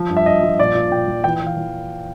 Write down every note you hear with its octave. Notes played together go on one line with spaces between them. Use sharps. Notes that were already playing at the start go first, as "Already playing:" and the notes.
Already playing: F3
G2
E5
G2 D#5
F3
A#2 D5
A#2
A#2 G5
F3
E3 G5
E3
F5
E3